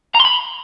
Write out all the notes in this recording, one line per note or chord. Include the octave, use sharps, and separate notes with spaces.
A#5
C6
B5